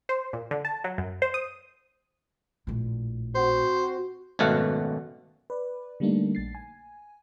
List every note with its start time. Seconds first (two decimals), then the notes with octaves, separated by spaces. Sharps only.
0.09 C5
0.33 A#2
0.51 D3
0.65 A5
0.84 F#3
0.98 F#2
1.22 C5
1.34 D#6
2.67 A#1 A2
3.35 C4 F#4 C5
4.39 G#1 F#2 B2 A3 F5 F#5
5.50 B4 D5
6.00 D3 G3 A3 A#3 D4 D#4
6.35 A#1 A6 C7
6.55 G#5